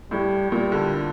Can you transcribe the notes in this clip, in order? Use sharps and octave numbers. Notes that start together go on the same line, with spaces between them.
A2 G3
A#2 G3
D3